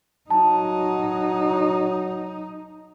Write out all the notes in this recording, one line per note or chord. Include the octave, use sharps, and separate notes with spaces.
F#3 D#4 A5